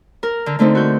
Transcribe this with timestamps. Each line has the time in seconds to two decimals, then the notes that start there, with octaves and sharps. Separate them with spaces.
0.23 A#4
0.46 D3
0.59 D3 A3 C4 D#4
0.75 F#4 G6